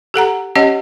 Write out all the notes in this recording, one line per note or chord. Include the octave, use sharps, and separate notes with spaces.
G4 A4 F#5 A#5
C#4 G4 C#5 D#5 F#5